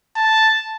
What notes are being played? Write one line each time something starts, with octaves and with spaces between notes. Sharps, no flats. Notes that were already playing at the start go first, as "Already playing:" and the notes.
A5